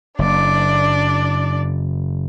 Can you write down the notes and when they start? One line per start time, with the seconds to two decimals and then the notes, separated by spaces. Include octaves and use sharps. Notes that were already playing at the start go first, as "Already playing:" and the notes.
0.19 F#1 D4 D5